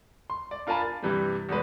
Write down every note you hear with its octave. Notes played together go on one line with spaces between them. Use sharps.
C6
D5
D4 F4 A#4 G#5 A5 B5
A6
G2 C3 E3 G3
E2 B2 G#3 B4